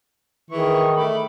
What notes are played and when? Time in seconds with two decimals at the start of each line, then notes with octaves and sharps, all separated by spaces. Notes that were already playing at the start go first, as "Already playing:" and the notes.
0.50 D#3 E3 G#4 C#6
0.96 A3 B5 D6